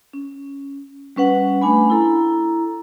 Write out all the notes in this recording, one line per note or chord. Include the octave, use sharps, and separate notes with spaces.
C#4
G3 C#4 B4 F#5
A3 D4 G#5 B5
E4 A4 A#5